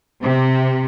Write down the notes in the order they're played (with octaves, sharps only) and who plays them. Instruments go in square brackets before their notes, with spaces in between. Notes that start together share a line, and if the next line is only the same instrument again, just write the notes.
[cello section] C3